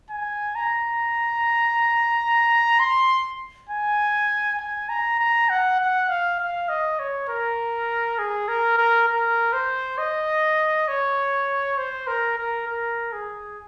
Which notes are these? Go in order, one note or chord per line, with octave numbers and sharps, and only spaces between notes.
G#5
A#5
C6
G#5
G#5
A#5
A#5
F#5
F#5
F5
F5
D#5
C#5
A#4
G#4
A#4
A#4
A#4
C5
D#5
C#5
C5
A#4
A#4
A#4
G#4